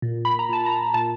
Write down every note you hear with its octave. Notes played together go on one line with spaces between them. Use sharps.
A#2
B5
A#5
A#2 A5
A#5
A#2 A5